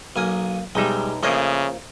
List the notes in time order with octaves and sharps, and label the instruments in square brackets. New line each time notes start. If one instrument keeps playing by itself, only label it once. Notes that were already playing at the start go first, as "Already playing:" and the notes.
[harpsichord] B1 G#5 D#6 [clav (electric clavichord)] A#3
[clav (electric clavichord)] B1 D#4 E5 [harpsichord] G3 G#3
[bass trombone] C#3 [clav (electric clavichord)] F3 A#3 [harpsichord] A3 D4 D#5